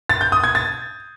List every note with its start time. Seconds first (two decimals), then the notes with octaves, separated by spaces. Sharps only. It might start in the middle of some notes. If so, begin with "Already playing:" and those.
0.09 A6
0.21 G6
0.32 D#6
0.44 G#6
0.55 A6